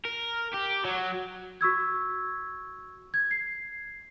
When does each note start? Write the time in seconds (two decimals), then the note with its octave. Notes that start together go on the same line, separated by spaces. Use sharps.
0.05 A#4
0.54 G4
0.85 F#3
1.61 F#4 C#6 E6 G#6
3.14 G#6
3.31 C7